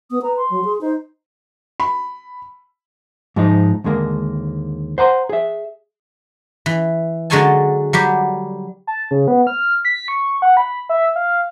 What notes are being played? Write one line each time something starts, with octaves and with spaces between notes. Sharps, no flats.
B3 D#6
B4 A#5
C6
F#3
G#4
D#4 C5
B5
G#2 F3 G#3 D#4
D#2 D3 G#3 A#3
C5 F#5 A#5 C6
G#4 E5
E3
D3 F#3 G#3 C#5 G#5 A5
F#3 G3 G4
A5
C#3
B3
F6
B6
C#6
F#5
B5
E5
F5